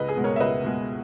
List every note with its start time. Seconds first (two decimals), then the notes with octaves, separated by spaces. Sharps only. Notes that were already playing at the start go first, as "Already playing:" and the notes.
Already playing: C#2 B4 D#5
0.09 G#4
0.16 B2 G#3
0.24 A#4 C#5
0.36 E5
0.40 C#2 B4 D#5
0.64 B2 G#3